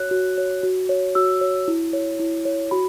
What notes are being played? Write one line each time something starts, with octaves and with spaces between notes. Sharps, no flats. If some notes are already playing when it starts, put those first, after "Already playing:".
Already playing: F#4 C#5 F#6
F#4
C#5
F#4
C#5
F#4 E6
C#5
E4
C#5
E4
C#5
F#4 B5